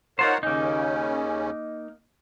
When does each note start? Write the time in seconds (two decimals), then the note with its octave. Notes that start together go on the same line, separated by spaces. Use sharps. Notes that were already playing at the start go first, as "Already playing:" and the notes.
0.19 D#4 F4 A#4 C5 C#5 F#5
0.43 D#2 C#3 A#3 C#4 D#4